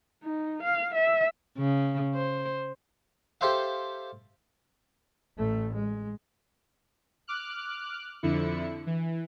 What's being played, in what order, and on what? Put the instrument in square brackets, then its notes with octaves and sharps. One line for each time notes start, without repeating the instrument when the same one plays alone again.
[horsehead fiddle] D#4
F5
E5
[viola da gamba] C#3
C5
[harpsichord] G4 A4 C5 E5 F5
[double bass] A1 A3
G#3
[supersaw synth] D6 F6 F#6
F2 D3 E4 C#7
E3